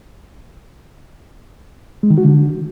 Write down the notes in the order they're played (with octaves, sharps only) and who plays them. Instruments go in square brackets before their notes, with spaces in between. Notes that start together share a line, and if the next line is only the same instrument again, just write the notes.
[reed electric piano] G#3
D#3
F#4
D3